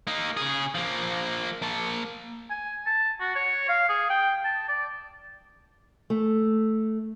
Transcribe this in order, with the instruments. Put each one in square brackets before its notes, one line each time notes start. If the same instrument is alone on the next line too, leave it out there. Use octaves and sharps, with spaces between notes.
[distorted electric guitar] A#3 D#4
C#3 G#4
F3 A#3
A#3 A5
[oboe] G#5
A5
F#4
C#5
F5
G#4
G5
A5
D5
[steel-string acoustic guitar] A3